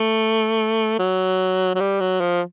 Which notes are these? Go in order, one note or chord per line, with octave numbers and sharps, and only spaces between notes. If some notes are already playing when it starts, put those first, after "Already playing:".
Already playing: A3
F#3
F#3
G3
F#3
F3